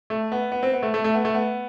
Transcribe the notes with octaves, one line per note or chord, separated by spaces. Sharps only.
A3
B3
B3
C4
B3
A3
A3
A3
B3
A3
B3